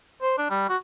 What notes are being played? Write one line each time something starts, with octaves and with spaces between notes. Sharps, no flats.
C5
D4
G3
F#4